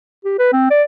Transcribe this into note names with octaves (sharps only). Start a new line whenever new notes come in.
G4
B4
C4
D5